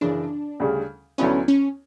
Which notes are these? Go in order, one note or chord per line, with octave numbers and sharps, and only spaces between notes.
F#2 C#3 E3 D4
D2 C#3 G3
D2 D3 F#3 B3 C#4 E4
C#4